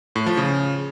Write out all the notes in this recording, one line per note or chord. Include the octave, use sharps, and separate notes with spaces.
A2
F3
C#3